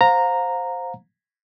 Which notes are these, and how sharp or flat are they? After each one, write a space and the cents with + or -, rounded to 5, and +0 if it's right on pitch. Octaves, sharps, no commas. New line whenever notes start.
C5 +0 F5 +35 A#5 -5